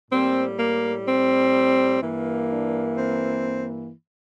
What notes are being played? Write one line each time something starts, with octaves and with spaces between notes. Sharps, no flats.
A2 G3 A#3 C4
A#3
C4
G2 E3 A#3
D4
C4